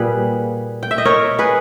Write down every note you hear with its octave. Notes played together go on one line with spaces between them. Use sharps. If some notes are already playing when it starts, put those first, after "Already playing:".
Already playing: A#2 G3 G#4 B4
G5
E5
D#5
A#4 C#5
G#4 B4